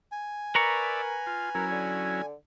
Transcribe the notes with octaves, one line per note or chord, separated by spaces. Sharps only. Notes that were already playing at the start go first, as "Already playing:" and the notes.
G#5
A#4 B4 D5 E5 A#5 C#6
F4
F#3 C#4 E4 A#4
D3